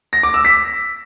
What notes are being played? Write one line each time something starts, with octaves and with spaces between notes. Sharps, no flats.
A#6
D6
E6
B6